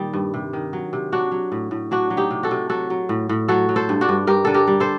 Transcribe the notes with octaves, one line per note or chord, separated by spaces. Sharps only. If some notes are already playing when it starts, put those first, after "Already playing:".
Already playing: A#2 D#3 G3
G2
C3
D#3
F#3
C3
F#3 D4 F#4
F#3
A2
A2
F#3 D4 F#4
F#3
D#4 G4
C3
F#4 A4
C3
F#3 F#4 A4
F#3
A2
A2
F#3 F#4 A4
F#3
A4 C5
G2
D4 F#4
G2
G2 G4 A#4
D3 A4
G4 A#4
G3
A4 C5